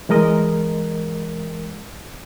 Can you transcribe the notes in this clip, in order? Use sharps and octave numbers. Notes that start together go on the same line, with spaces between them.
E3 G#3 A#4 D#5